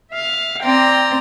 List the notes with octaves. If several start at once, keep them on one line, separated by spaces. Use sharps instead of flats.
E5 F5
C4 D5 G5 A#5 C6